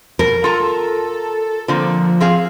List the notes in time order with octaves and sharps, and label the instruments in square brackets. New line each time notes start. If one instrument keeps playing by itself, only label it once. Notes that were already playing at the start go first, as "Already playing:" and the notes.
[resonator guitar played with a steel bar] B2 [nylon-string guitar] A#4
[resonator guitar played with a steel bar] F4 A#5 [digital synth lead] A4
[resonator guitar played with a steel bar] D3 A#3 C4 [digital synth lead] F3
[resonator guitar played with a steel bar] C4 G#4 F5